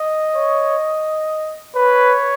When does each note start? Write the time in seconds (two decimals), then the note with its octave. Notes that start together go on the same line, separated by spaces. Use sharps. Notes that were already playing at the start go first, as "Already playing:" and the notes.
Already playing: D#5
0.35 C#5
1.75 B4 C#5